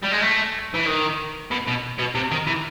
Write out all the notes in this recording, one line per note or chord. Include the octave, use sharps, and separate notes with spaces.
G3
G#3
A3
E3
D#3
B2
B2
B2
C3
D#3
E3